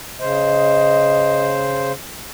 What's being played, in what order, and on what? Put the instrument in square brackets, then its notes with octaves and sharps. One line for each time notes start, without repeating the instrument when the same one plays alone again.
[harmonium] C#3 C5 [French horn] D#5